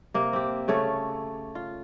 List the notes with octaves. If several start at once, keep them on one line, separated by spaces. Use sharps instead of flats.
C3 A#3
C4 G4
C#3 A3 A4 C#5
F4